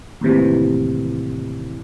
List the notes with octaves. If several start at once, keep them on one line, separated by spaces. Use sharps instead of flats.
D#2 A2 C3 E3